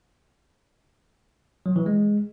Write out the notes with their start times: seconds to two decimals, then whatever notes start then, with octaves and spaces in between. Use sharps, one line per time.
1.66 F#3
1.76 E3
1.86 G#3